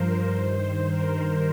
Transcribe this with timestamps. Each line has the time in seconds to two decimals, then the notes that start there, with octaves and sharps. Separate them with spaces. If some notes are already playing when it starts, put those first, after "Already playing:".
Already playing: G2 F3 A#4 C5
0.31 G2 D#3
0.87 A#4